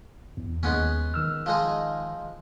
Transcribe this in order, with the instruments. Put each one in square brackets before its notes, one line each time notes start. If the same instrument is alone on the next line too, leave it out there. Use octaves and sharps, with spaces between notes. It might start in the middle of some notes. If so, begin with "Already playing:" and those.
[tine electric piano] E2
[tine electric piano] D#2 [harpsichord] G#3 B3 C#4
[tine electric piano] D#3 E6 F6
[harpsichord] F3 G#3 D#4